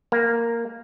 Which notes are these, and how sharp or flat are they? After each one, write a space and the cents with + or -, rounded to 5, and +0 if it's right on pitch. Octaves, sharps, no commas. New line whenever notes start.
A#3 -5